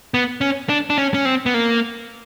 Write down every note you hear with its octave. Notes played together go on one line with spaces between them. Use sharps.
B3
C#4
D4
D4
C#4
C#4
C4
B3
A#3